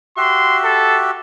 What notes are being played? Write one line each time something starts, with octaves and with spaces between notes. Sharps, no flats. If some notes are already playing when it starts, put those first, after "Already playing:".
F#4 G4 E5 C6
A4